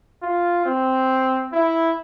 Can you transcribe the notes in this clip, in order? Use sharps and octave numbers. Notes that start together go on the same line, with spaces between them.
F4
C4
E4